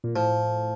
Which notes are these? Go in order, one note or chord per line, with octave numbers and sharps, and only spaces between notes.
A#2
A2 F3